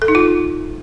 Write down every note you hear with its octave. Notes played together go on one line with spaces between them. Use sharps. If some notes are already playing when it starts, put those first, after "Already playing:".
A4
D#4
F4